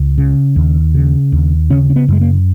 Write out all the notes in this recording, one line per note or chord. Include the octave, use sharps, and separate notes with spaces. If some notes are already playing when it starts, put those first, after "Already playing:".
Already playing: C#2
C#3
D#2
C#3
D#2
C#3 C#4
C#4
B3
F#2 G#3
A#3